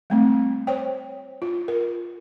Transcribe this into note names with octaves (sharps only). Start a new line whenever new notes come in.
G3 A3 C4
C5 C#5 G5
F4
A#4